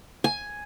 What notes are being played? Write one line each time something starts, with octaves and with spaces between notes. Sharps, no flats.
G#5